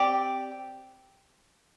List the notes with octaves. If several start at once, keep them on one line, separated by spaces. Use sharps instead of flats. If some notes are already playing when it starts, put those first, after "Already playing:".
Already playing: C4 G4 D5